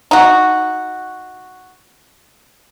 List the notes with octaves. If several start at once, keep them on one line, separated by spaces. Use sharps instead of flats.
D#4 F#4